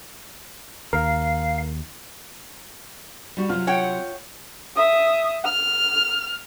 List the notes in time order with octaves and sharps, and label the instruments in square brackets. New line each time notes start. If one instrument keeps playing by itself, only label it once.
[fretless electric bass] D#2 [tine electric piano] A#4 [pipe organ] F5
[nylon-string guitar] G3 F#4
[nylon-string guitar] C3 F#3 [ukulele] F4
[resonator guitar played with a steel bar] C#5 F#5 G5
[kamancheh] E5 D#6
F6